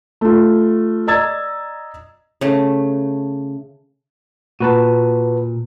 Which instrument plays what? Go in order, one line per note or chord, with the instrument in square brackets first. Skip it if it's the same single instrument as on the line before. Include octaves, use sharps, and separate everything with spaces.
[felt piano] A3 F4
D5 D#5 A#5 E6 G#6 A6
[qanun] C#3 A3
[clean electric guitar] A#2 [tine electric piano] F#4 B4 A5